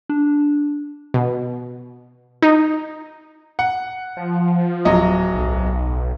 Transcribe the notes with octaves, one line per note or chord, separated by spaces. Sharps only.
D4
B2
D#4
F#5
F3
D1 F#3 D#5
B1